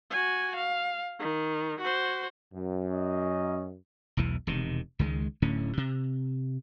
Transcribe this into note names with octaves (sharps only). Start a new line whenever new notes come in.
F#4 G#5
F5
D#3
F#4 C5
F#2
C#4 D#5
E1 B1 E2 E3
E1 C3 D#3
C#2 D#3 G#3
D1 A2 D3 C#4
C3